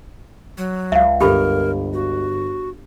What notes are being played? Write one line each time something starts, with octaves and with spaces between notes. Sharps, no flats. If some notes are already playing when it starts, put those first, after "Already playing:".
F#3
C#2 E5 F5
G1 G4 A4 A#4 B5
F#4